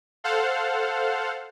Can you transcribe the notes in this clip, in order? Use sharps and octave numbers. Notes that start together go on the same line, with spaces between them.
A4 C5 F5 F#5